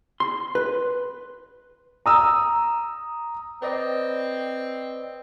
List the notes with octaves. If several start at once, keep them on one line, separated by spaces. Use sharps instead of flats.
C6
B4
A#5 D#6 E6
C4 B4 D5 D#5